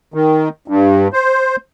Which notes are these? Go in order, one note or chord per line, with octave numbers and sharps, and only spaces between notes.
D#3
G2
C5